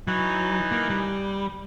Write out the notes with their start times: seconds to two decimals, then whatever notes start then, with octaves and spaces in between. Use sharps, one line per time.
0.07 E3 F#3 D#4
0.72 A#3
0.90 G3